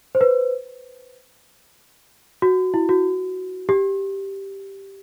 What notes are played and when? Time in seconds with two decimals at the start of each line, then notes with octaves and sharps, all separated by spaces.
0.15 C5
0.21 B4
2.42 F#4
2.74 E4
2.89 F#4
3.69 G4